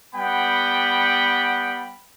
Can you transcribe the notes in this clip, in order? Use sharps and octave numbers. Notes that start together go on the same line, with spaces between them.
G3 B3 F#5 G5 B5